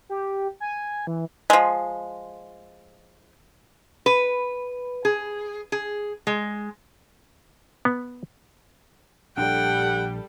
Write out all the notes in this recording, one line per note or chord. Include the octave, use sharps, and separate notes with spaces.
G4
G#5
E3
F3 G#3
B4
G#4
G#4
G#3
B3
A#1 G3 D4 A4 F#5 G5